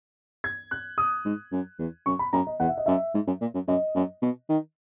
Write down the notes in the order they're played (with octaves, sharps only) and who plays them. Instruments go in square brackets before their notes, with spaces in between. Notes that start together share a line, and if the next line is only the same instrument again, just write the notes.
[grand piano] G#6
F#6
D#6
[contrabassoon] G#2
F#2
E2
[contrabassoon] F#2 [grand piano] C#6
[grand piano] B5
[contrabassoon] F#2 [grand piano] A#5
[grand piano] D#5
[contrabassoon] E2 [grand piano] F#5
[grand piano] E5
D#5
[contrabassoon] F#2 [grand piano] E5
[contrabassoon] G#2
F#2
A#2
F#2
[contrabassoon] F#2 [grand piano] D#5
[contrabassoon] F#2
B2
D#3